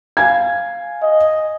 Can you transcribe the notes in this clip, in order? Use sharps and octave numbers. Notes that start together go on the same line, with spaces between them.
F5 G#5 G#6
D#5